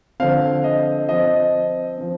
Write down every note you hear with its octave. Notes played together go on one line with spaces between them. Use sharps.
D3 F3 C4 F5
D#5
F3 C4 D#5
F3 C4